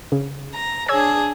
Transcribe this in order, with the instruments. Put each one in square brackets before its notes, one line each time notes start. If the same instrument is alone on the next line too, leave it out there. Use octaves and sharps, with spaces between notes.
[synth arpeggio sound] C#3
[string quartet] A#5
[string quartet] D4 G#4 [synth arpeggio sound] C#5 E6 G#6